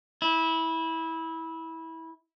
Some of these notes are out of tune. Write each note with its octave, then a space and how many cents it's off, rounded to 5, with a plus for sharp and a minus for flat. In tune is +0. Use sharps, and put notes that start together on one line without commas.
E4 -20